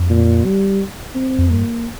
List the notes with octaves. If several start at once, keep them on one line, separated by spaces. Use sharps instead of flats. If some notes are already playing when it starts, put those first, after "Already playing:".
Already playing: F2
A#2
G3
C4
F2
G2 A#3